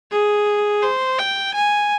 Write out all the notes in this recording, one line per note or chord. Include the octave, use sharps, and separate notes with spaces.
G#4
C5
G5
G#5